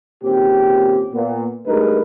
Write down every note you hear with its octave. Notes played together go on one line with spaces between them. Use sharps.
G#1 A#2 C4 C#4 G4
A#2 B3
G2 G#3 A3 D#4 A#4 B4